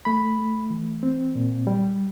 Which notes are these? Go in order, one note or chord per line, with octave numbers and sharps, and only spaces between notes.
A3 B5
A3
E3
C4
A#2
G3